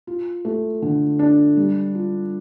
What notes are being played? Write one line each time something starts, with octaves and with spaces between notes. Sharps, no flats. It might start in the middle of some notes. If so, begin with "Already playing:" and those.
F4
A3
D3
D4
G3
F4